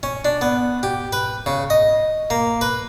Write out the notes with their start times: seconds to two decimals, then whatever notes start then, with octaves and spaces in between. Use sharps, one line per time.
0.03 C#4
0.25 D4
0.41 B3
0.83 G4
1.13 B4
1.46 C#3
1.70 D#5
2.30 A#3
2.61 B4